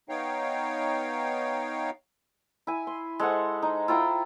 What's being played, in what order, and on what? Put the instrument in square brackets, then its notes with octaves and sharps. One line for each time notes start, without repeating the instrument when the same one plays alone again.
[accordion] B3 D#4 C#5 F5 G5
[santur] E4 G#5
C6
G#3 A4 C5 F#5
D#4
E4 F4 G5 A#5